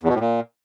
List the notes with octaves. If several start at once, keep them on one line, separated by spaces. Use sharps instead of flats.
E2
B2
A2
A#2